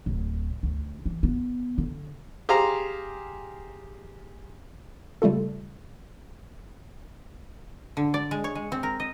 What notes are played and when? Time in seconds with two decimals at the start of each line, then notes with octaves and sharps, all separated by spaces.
0.06 D1
0.63 D2
1.05 E3
1.23 B3
1.78 D3
2.49 G4 G#4 C5 F5 A#5
5.22 C#3 G3 A3 F4 A4
7.97 D3
8.14 D5
8.31 G#3
8.44 C#5
8.55 G#3
8.72 C4
8.83 A#4
9.00 D#5